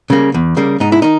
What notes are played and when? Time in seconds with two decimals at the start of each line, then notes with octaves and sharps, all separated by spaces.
0.10 C#3 G3 A#3
0.34 E2
0.57 C#3 G3 A#3
0.80 G#2 D#4
0.92 E4
1.02 D#3 D#4